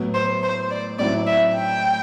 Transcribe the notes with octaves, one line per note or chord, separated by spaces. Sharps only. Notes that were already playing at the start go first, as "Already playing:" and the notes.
Already playing: A2 F#3 B3
C5
C5
D5
A2 F#3 C4 E4 D5
E5
G5